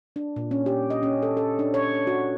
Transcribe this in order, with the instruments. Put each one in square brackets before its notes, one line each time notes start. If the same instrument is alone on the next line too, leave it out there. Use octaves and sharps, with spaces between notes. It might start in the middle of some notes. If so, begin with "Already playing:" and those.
[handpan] D4
A#2
C#4
G4
D#5
C#4
A4
A4
D4
C#5
F#4